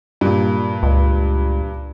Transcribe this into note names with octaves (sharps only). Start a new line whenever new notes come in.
G2 A#2
C#2